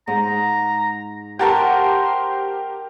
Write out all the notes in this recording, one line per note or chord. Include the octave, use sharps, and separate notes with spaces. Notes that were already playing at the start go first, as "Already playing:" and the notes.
G#2 A#5
G4 A#4 C5 F#5 A5 C#6